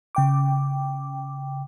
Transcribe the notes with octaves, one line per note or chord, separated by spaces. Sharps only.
C#3 G5 D6